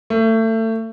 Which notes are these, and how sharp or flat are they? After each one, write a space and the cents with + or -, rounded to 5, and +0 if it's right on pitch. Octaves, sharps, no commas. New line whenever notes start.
A3 +30